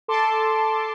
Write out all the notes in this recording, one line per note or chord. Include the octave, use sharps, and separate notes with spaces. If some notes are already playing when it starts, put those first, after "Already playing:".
A4 A5 C6 D6